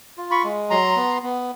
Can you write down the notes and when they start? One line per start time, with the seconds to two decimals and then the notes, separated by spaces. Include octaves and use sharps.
0.17 F4
0.31 B5 C#6
0.44 G#3
0.70 F#3 A#5 C6
0.96 B3
1.23 B3